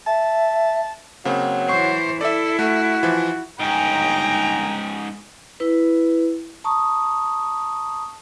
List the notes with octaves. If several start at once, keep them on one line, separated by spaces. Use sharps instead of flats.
E5 A5
C#3 F#3 A#3 C4
E3 C5 C#6
E4 A4 D5 E5
A3 F#4
E3 F3
G1 D#2 G#2 C#4 D#5 G5 G#5 A#5
E4 B4
A5 A#5 C#6 D#6